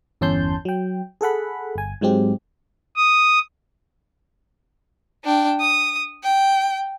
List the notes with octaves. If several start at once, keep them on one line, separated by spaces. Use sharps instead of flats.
G1 E2 C#4 A5 C6 G6
F#3 G5
G#4 A4 F#5 B5
G1 G#5
G#2 F#3 G#3 C4 G4
D#6
D4 G5
D#6
G5